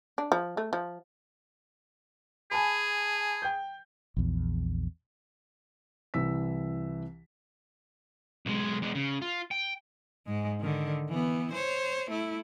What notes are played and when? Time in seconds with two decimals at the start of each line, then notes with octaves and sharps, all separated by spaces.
0.18 D4
0.32 F3
0.57 A3
0.73 F3
2.51 G#4 G#5 A5 B5
3.42 G5 G6
4.17 A#1 E2
6.14 C2 E3 E6 B6
8.46 B1 G#3
8.82 E2 G#3
8.95 C#3
9.22 F4
9.51 G5
10.26 G#2 G#3
10.60 D3 D#3
11.09 E3 B3
11.53 C5 C#5
12.11 A3 E4